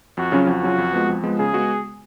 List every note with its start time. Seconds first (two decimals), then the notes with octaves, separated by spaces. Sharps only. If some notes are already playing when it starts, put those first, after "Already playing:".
0.17 F2 F#4
0.32 C#3 F#3 C#4 F4
0.47 F2 F#4
0.63 C#3 F#3 C#4 F4
0.78 F2
0.93 F3 G#3 B3
1.09 F2
1.24 F3 G#3 B3
1.39 C#3 G#4
1.53 G#3 B3 F#4